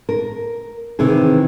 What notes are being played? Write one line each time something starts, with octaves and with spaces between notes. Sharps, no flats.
A#4
C3 D#3 E3 G#4